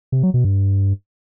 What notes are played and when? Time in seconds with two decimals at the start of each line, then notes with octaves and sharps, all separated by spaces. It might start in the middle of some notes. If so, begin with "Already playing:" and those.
0.12 C3
0.23 F#3
0.34 B2
0.45 G2